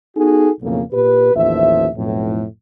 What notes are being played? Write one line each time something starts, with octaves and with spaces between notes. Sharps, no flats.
B3 D#4 F#4 G#4 A4
B1 F2 A2 C#3 A#3
A#2 G4 B4
A1 D#2 F3 E5
B1 F2 A2